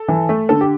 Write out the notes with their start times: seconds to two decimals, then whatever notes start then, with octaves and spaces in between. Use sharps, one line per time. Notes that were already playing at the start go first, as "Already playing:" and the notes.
Already playing: A4
0.08 E3
0.29 A3
0.49 D3 A4
0.61 G4